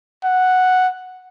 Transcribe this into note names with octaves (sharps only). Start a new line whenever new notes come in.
F#5